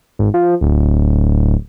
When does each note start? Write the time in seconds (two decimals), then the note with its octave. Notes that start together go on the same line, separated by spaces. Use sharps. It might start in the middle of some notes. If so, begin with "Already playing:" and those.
0.19 G#1
0.34 F3
0.61 D1